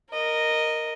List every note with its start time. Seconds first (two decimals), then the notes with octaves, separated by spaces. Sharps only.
0.12 A#4 D#5